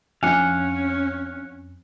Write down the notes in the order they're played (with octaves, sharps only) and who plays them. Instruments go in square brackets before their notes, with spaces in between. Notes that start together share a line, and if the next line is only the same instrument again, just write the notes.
[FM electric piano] F2 [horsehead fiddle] C#4 [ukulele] D4 G#5 [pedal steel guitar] F5 F#5